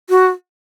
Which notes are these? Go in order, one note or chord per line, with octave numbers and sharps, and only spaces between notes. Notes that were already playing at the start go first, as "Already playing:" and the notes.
F#4